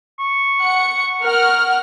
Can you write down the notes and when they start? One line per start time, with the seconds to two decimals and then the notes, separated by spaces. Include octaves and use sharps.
0.19 C#6
0.60 F#5 C#7
1.24 A#4 F#5 F6